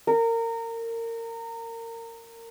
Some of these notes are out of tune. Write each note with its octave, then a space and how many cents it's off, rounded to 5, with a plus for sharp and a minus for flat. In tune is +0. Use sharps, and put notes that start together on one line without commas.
A#4 -25